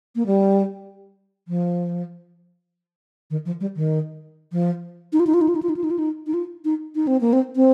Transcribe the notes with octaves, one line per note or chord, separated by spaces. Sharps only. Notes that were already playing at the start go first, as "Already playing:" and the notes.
A#3
G3
F3
D#3
F3
G3
D#3
F3
D#4
F4
D#4
F4
D#4
F4
D#4
F4
D#4
F4
D#4
F4
D#4
D#4
F4
D#4
D#4
C4
A#3
C4
C4